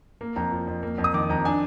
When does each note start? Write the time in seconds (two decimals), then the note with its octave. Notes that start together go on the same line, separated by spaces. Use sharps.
0.21 A#3
0.36 F2 A#5
0.52 F3
0.67 F2
0.83 A#3
0.98 F2
1.04 D#6
1.14 D#3 D6
1.29 F2 A#5
1.45 D4 G#5